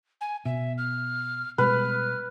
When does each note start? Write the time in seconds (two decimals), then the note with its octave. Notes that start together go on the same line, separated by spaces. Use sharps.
0.21 G#5
0.45 B2 E5
0.78 F6
1.58 B2 G3 G#3 B4 F6